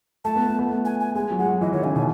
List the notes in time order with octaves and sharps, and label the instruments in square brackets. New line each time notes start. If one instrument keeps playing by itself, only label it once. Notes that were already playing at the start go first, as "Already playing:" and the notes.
[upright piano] A3 [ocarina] A5
[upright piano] B3
A3
B3
A3
[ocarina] G#5
G#5
[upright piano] G#3 [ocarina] G#5
[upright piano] F#3
[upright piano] G#3 [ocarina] F#5
[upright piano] F#3
[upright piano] E3 [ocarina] D#5
[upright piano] D#3 [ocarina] C#5
[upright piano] C#3 [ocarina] G#5
[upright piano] B2 [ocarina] G#5